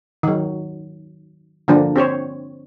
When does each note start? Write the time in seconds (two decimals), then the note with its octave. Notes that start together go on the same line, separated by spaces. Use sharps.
0.23 D#3 F#3
1.68 D3 F3 A#3 D4
1.96 C4 G4 C5 C#5